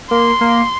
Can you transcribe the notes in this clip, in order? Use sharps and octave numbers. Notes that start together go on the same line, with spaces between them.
A#3 C6
A#3